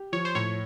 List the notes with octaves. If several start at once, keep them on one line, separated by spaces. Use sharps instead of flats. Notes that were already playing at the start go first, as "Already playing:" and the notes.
Already playing: G4
F3 C#5
C5
A2 C#5